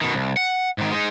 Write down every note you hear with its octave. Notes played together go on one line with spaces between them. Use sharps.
B2 D#3
C2
F#5
G#2 D#3
G#3 D#4